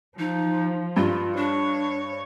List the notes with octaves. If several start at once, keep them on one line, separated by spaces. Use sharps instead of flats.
F3 D#4
G2 F4
D4 C#5